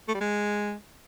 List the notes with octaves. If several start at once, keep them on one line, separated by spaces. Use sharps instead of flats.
A3
G3
G#3